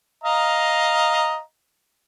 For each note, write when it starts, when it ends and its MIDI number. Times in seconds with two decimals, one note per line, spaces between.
0.24 1.40 75
0.24 1.40 77
0.24 1.40 82